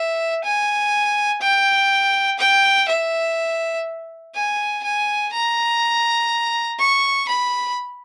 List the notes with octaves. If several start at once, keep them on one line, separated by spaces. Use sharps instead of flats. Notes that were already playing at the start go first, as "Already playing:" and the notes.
Already playing: E5
G#5
G5
G5
E5
G#5
G#5
A#5
C#6
B5